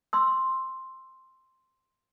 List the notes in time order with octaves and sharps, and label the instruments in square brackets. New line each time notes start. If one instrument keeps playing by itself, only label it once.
[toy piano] C6 E6